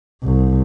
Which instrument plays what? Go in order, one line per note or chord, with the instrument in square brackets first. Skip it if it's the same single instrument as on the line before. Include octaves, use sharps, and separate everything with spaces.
[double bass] C2